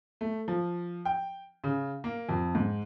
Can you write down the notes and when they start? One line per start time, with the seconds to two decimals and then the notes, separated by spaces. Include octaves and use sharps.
0.21 A3
0.48 F3
1.05 G5
1.64 C#3
2.04 A#3
2.29 F2
2.55 G#2